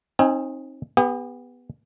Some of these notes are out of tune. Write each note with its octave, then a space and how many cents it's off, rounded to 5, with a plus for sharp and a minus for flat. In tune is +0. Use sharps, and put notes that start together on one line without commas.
C4 +35 D#4 +5 G#5 +0
B3 +0 G4 +40